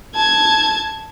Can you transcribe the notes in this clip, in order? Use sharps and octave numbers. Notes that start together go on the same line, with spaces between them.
A5 G#6